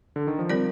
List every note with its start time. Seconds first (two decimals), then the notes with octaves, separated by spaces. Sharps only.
0.16 D3
0.27 D#3
0.39 F3
0.50 G3 C4 F4 A#4 D5